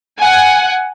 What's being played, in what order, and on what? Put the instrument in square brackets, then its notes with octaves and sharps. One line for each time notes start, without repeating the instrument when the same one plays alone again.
[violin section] F#5 G#5